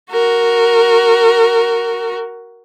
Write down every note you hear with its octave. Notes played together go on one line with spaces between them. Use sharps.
F#4 A#4